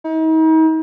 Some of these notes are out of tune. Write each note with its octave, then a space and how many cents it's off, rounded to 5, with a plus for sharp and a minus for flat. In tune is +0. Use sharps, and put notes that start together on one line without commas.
D#4 +40